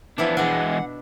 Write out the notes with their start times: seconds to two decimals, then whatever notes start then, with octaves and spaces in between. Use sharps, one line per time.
0.18 E3 F3 B3 D4 E4
0.37 B2 E3 G#3 D4 F#5